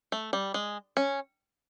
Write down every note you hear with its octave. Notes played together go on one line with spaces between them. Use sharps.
A3
G3
G#3
C#4